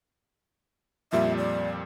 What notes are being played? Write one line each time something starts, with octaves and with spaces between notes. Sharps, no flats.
F2 A#2 G3 E5
D5